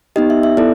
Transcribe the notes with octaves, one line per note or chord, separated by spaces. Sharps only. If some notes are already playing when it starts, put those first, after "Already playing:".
B3 D#4 G4 D#5
E5
E5
B3 E4 A4 D5